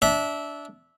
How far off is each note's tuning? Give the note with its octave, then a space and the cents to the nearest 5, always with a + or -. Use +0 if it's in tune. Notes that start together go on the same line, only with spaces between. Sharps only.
D4 -20 E5 -15